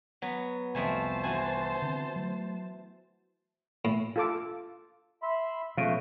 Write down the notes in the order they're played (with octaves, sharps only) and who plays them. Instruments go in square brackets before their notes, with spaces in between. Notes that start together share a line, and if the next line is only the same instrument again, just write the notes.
[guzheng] F#3 B3
[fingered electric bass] C2 [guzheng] F2 A3 G#5 [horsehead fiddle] C5 A5
[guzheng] E3 F#4 G#5
[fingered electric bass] D3 C4
F#3 A3
[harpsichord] A2
[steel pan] F4 A4 D6
[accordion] E5 B5 C6
[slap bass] B2 [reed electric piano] F3 G#3 C#4 [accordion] A3 [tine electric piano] F5